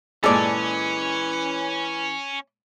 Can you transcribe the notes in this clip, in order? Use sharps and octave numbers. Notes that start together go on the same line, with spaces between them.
A#2 E3 G#3 C#4 A4 D5